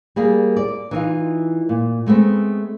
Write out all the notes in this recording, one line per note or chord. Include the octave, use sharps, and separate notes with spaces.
G3 A#3 G#4 A#4
D5
E3 D#4 F4
A#2
G#3 A3 B3 C4